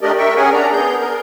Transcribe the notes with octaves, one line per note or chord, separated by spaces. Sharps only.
A3 D4 G4 A#4 D5 D#5
A#4 E5 G5 C#6
C#4 G#4 A#4 F#5 G#5
D4 D5 A#5
B3 G#4 G6
A#4